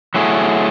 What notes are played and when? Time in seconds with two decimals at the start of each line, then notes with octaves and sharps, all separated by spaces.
0.14 F#3 A3 E4 G#4